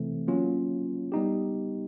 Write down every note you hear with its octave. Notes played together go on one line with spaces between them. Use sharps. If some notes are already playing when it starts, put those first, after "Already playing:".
Already playing: C3 E3 A3 C4
F#3 A#3 C#4 F4
G3 B3 D#4 G4